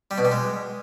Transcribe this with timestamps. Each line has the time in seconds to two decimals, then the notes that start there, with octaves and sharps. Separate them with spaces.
0.11 G3
0.18 B2
0.25 G3
0.32 G#3